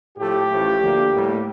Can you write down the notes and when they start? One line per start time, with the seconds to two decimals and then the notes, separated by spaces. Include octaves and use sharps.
0.18 A2 F3 A3 G4
0.50 A1 A2 F3 A3
0.82 D2 D3 F3 A#3
1.14 A2 G3 A#3